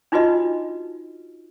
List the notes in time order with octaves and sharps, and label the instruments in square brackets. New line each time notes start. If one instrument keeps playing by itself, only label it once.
[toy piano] D4 D#4 F4 F#4 B4 D#5